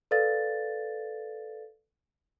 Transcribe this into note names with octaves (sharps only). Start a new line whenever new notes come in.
A4 B4 D5 F5 A6